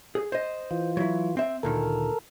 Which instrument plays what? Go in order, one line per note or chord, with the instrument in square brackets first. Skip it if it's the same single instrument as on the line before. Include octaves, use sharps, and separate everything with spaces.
[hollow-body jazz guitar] G#4
C5 D#5
[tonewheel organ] E3 F4
[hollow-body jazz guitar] F#3 E4
C4 E5
[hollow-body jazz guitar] D2 A#2 D#3 [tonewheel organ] A4 A#4